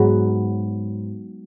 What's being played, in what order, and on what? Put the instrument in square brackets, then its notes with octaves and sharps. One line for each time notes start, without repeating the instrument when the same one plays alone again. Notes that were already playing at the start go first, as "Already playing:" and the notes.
Already playing: [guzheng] G#2 F#3 B3 F#4